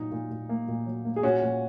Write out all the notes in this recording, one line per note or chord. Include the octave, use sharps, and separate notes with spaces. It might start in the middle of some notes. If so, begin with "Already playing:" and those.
Already playing: A#2 F#3 D#4
A#2
A#2
A#3
A#2
F#3
A#3
G#4
A#2 C#4 F#4
A#2